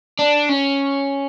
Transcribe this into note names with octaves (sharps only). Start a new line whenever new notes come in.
D4
C#4